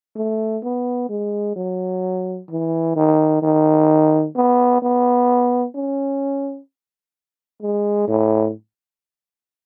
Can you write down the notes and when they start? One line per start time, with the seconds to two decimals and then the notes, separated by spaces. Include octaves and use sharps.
0.16 A3
0.63 B3
1.09 G#3
1.56 F#3
2.50 E3
2.96 D#3
3.42 D#3
4.35 B3
4.82 B3
5.75 C#4
7.62 G#3
8.08 A2